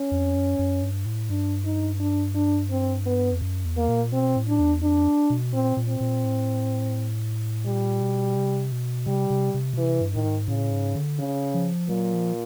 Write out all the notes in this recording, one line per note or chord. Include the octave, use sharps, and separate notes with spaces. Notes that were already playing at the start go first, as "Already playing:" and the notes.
Already playing: C#4
F2
F#2
F#2
G2
A2
G2 D4
D#4
D4
D4
C4
B3
F2
F#2
E2
A#3
A#2
B2 C4
A2
D4
E2
F2 D4
B2
A#2 C4
A#2
C4
A#2
A2
A#2 G3
B2
C3
B2
C3 G3
C3
C3
B2
C3 E3
G2
A2 D#3
G#2
A2 C#3
G#2
D3
C#3
F3
A#2 F#3
F3